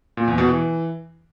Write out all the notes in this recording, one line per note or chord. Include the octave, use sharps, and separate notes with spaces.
A#2
E2
B2
E3